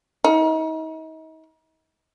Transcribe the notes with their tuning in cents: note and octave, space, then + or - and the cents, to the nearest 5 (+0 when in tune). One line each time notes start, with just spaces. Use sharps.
D#4 +40